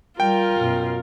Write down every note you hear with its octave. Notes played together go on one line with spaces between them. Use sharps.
G3 F4 A#4 G5
F#2 B2